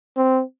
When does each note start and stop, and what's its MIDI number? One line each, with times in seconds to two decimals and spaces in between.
0.17 0.42 60